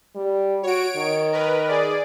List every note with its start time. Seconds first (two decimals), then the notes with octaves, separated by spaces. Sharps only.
0.16 G3
0.63 F#4 C#5 D7
0.97 D#3
1.33 A#4 B4
1.69 G#4 D5